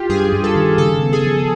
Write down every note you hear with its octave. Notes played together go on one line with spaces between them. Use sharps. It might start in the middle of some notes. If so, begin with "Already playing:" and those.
Already playing: F4 G4
G2 G#4
G2
A4
D#3
C#3 A4
B3
G#4
F3